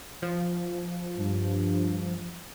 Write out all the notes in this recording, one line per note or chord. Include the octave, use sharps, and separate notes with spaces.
F3
G2